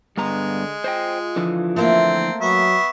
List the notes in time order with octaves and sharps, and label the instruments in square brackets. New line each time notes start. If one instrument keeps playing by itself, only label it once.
[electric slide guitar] G2 B3 A#5 [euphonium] D3 [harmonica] G#3
[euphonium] F4 [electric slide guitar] C5 D#5 G5
[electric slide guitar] D3 E3 F3
[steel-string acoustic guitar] A3 A#3 [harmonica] C4
[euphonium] F#3 [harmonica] B3 E5 C#6